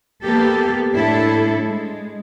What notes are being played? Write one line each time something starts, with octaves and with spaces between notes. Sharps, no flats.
A#3 B3 G4 A4
A2 D4 E4 A4
G#3